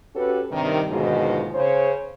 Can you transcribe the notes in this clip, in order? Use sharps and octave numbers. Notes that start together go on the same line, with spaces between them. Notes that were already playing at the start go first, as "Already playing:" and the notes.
C#4 F#4 G4 A4 B4
G2 C3 D#3
D#2 G#2 B2 D3 D#3 F3
C#3 C5 C#5